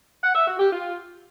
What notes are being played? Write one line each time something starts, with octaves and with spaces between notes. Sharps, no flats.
F#5
E5
F#4
G4
F4